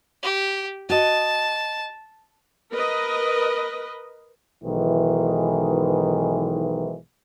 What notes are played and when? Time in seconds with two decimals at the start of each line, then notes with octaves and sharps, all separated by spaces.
0.23 G4
0.89 F#4 D#5 A5
2.71 A#4 B4 D#5
4.64 B1 G#2 D#3 E3